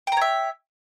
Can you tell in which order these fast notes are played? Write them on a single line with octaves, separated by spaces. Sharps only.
G5 A#5 C#5 E5